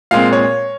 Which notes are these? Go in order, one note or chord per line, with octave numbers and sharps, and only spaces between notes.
A#2 G#3 C4 F5
C#5